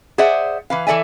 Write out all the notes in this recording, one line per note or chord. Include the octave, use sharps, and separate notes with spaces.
G#4 C5 D5 E5 F#5
E3 B4 F5
E3 A4 D5 E5 G#5